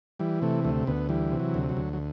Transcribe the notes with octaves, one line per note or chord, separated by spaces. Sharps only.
E3 G3
C3 A3
D2 A3
D2 B3
E3 G3
C3
F#3
D2
F#3
D2
F#3